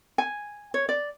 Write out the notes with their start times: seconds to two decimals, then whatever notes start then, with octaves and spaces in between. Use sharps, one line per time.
0.18 G#5
0.74 C#5
0.89 D5